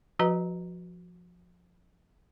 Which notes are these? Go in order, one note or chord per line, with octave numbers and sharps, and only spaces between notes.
F3 F#4 B4 D#5 A#5